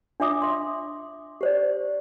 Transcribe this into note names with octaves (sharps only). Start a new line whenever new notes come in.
D4 F4 E5 D6 D#6
E5 C6
G4 C5 D5